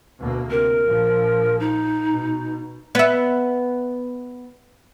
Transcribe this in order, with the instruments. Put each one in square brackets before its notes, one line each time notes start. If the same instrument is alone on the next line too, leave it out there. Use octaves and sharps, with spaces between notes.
[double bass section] D2 B2 A#3
[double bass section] C3 [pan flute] A#4
[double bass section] A#1 F3
[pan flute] D#4
[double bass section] B2
[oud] B3 E5